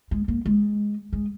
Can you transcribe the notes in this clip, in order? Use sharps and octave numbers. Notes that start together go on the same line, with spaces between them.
G#3
A#3
G#3
G#3